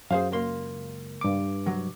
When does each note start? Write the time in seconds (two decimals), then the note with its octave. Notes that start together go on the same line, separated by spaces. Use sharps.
0.11 F#2 G#4 C5 F5
0.32 C#2 A#3 C6
1.21 G2 D6
1.66 C2 F#3